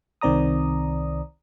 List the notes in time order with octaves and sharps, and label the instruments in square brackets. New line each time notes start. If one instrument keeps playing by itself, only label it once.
[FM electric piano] C2 D#3 C4 D5 A#5 D#6